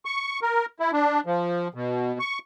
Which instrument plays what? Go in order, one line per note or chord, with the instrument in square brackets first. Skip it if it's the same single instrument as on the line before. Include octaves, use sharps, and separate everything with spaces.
[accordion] C#6
A#4
E4
D4
F3
B2
C#6